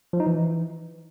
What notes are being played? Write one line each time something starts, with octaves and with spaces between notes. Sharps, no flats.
F3
D#4
E3